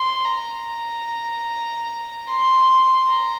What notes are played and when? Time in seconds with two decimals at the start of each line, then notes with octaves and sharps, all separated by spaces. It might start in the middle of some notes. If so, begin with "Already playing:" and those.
Already playing: C6
0.25 A#5
2.28 C6
3.09 A#5